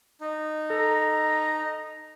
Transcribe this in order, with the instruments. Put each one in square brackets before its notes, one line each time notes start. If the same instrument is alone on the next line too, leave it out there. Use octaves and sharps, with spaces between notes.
[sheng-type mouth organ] D#4
[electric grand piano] A4 [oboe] A#5